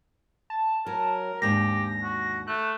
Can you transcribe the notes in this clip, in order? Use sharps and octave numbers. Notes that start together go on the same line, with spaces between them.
A5
F#3 A#4
D#2 G#2 D4 G4 A#6
F#4
A3 F#6